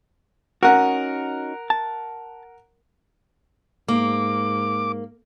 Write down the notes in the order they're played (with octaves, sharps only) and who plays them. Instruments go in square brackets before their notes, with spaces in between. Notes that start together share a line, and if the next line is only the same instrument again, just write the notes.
[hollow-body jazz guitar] C#4 D#4 F#4 [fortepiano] A#4 F#5
[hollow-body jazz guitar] A5
[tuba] G#2 [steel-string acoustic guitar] A#3 [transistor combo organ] D6